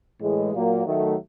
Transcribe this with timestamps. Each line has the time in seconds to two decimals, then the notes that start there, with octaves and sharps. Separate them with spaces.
0.20 A2 E3 G#3
0.52 A#2 F#3 A#3
0.84 D#3 F#3 A3